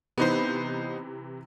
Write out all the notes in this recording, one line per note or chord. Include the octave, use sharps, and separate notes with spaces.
C3 E3 B3 D#4 C5 B5